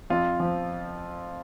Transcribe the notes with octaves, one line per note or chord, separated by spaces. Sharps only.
F2 F4
F3